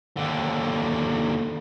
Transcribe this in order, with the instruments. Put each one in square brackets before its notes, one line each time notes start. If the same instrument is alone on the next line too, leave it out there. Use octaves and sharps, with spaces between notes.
[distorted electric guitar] D#2 D3